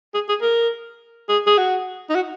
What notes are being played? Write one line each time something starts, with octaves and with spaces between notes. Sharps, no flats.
G#4
G#4
A#4
G#4
G#4
F#4
D#4
F#4